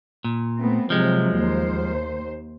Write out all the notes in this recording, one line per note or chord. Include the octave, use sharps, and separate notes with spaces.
A#2
A3 B3 C4
C3 F3 F#3 G#3
D#2 C5